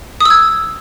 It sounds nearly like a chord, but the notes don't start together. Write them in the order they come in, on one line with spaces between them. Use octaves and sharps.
D#6 E6 G#6